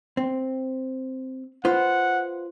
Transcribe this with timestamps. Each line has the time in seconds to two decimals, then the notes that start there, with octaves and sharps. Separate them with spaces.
0.17 C4
1.65 F4 B4 C5 F#5